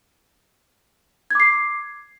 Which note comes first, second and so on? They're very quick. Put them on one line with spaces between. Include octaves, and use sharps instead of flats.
G#6 D6 C7